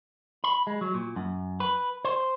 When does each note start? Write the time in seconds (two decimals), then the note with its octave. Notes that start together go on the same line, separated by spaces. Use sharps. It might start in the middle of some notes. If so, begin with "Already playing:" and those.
0.44 B5
0.67 G#3
0.81 F#3
0.94 A#2
1.16 F#2
1.60 B4
2.05 C5